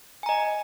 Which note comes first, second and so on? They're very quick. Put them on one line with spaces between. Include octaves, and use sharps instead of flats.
G#5 A#5 D#5